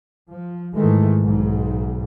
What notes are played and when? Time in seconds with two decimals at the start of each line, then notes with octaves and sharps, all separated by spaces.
0.30 F3
0.75 G#2 D#3 E3 G#3 A3
1.22 B1 G#2